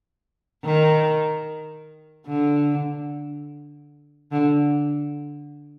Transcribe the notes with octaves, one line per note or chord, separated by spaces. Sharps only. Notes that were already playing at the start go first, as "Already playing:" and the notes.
D#3
D3
D3